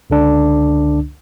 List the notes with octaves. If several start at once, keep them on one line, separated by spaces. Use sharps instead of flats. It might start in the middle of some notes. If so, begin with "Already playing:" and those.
C#2 D3 D4